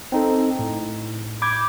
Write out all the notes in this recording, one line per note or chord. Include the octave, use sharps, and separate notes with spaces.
C4 D#4 A4
A2
B5 D6 G6 G#6